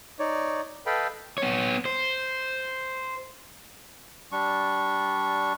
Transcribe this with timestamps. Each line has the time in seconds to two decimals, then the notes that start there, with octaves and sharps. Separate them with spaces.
0.19 D#4 C#5 D5
0.86 A4 B4 D#5 F5 G5 B5
1.38 B3 C#5
1.85 C5
4.32 G3 D4 C#6